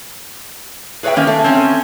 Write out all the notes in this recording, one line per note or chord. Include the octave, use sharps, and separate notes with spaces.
G#4 B4 C#5 D5 E5 G5
D#3 A#3 C#4
A3
C4 C#4